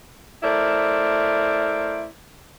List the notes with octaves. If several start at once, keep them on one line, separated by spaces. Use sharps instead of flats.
A3 E4 A#4 C5 D5